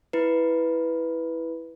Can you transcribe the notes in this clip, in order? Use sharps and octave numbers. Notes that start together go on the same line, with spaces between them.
E4 B4